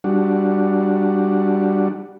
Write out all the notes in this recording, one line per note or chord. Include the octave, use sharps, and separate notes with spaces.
G3 D4 F#4